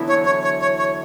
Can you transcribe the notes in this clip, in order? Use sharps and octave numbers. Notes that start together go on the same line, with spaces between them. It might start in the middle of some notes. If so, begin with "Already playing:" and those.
Already playing: E2 D3 F#3 B3 E4
C#5
C#5
C#5
C#5
C#5